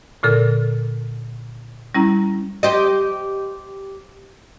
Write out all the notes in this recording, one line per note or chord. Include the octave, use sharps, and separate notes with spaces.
A#2 D3 A4 A#4
G3 C#4 E4 A#5
G4 C5 D#5